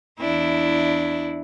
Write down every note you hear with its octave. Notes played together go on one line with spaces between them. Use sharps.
E2 D4 E4